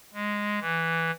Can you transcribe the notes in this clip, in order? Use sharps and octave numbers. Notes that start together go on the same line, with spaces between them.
G#3
E3